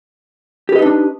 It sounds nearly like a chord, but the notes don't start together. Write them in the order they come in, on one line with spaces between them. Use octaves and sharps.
G4 B4 D#5 D#4 D4